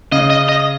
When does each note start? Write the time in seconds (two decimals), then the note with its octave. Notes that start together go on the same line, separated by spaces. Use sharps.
0.12 C#3 D#5
0.30 D#5
0.49 D#5